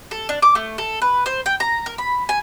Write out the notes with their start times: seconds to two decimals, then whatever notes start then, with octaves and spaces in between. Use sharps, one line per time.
0.11 A4
0.29 D4
0.42 D6
0.55 A3
0.78 A4
1.02 B4
1.26 C5
1.46 G5
1.60 A#5
1.86 A#4
1.98 B5
2.29 G#5